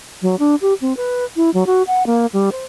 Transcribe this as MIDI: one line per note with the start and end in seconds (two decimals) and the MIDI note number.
0.22 0.36 54
0.39 0.55 62
0.61 0.74 67
0.81 0.96 60
0.97 1.25 71
1.36 1.50 64
1.54 1.66 54
1.66 1.83 66
1.87 2.06 78
2.06 2.26 58
2.33 2.50 55
2.52 2.65 72